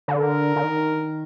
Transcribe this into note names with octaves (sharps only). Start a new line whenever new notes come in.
D3
A#4
D3
D#3